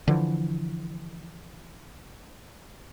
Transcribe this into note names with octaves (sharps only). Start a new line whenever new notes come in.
D3 E3 F3